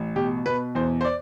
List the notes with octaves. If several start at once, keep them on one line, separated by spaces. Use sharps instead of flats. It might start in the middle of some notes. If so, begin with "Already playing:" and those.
Already playing: A1
B2 G4
B2 B4
E2 C5
C5
D5